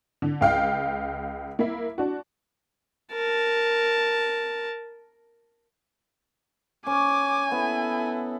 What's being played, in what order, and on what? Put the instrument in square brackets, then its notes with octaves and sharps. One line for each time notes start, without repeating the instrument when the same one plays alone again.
[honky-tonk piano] D3
C#2 F5 G5
A#3 E4
D4 F#4
[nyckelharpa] A#4 A5
[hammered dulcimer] C#4 [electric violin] G#5 [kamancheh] D6
[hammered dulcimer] B3 [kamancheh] E4 A4